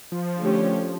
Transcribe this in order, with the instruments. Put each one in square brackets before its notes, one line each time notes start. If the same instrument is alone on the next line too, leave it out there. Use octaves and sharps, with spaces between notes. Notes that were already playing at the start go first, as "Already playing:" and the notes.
[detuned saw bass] F3
[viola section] D3 A3 C#4 G4 C#5